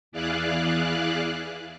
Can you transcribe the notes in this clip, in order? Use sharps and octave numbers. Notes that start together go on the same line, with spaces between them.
E2 E4 G#4 D5 F5 F#6